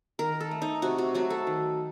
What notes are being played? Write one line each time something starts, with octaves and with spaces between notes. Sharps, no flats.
D#3 A#4
A4
A3
D#4
C3 F#4
F#4
F#3 A3 F#4
A4
D#3